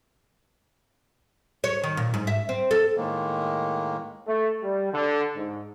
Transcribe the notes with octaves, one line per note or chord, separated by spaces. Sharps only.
C#5
D#3
A#2
G#2
E5
C4
A4
A2 D#3 G#3 A#3
A3
G3
D3
G#2